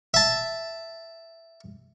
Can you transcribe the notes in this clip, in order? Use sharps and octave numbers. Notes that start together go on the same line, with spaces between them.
E5 A5